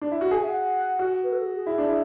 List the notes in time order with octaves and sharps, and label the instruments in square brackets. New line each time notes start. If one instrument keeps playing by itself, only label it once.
[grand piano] D4
E4
F#4
[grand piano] G#4 [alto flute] G#5
[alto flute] E5
F#5
[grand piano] F#4
[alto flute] B4
A4
G#4
G#4
[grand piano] E4
D4
E4